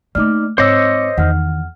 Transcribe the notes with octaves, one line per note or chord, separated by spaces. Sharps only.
A3 A#3 D#4 D5 D6 F6
G#2 C4 C5 C#5 D#5 D6 E6 C#7
E2 D#3 F#5 F6